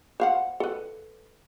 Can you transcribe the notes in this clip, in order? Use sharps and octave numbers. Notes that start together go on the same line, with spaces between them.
C5 F5 F#5
A4 B4